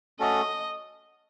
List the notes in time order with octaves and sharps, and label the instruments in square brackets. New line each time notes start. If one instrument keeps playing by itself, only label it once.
[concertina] A3 C#4 F#4 A4 [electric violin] D#5